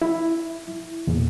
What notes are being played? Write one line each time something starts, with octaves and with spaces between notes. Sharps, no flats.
E4
E2 A#2